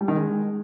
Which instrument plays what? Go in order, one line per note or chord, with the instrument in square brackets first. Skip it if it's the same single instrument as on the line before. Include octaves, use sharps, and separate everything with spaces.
[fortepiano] G3
D#3
G#3